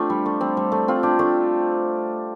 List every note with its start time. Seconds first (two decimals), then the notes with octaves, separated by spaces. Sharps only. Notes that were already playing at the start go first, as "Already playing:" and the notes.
Already playing: A3 C4 D4 F4 G4
0.10 G3
0.26 A3
0.41 G3 C4
0.57 G3
0.72 A3
0.88 C4 F4
1.03 D4 G4
1.19 A3 D4